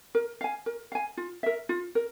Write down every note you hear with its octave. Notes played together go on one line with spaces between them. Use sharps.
A#4
F5 G#5
A#4
F5 G#5
F4
A#4 E5
F4
A#4